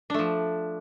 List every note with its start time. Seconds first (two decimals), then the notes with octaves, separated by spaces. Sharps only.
0.10 D4
0.14 A3
0.19 F3